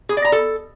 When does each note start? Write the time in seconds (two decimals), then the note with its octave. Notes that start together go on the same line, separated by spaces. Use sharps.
0.09 G#4
0.17 D5
0.25 A#5
0.32 A4